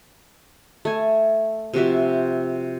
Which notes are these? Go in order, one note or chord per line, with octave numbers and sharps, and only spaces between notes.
A3 G#5
C3 F3 F#4 E5